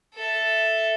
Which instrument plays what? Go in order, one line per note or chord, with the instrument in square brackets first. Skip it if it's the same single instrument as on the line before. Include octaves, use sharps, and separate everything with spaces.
[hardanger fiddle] A4 E5